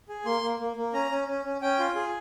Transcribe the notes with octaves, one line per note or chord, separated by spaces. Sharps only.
G#4
A#3 C6
A#3
A#3
A#3
C#4 A#5
C#4
C#4
C#4
C#4 G5
F4
G#4